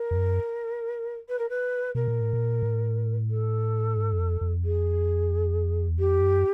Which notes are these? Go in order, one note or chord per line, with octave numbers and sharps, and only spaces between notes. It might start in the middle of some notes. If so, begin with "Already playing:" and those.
Already playing: A#4
F2
F#2
B4
A#4
B4
B2 A#4
A#2
A2
A#2
A2
A4
G#2
F#2
F2
F2
G#4
E2
F2 G4
F#2